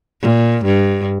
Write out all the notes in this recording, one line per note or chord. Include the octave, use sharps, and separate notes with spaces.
A#2
G2